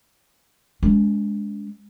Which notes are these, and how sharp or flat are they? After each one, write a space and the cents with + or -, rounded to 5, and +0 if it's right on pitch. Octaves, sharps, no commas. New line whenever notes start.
G#3 +0 D4 -40